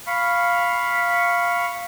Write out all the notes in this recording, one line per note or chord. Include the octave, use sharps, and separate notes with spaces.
F5 B5 C#6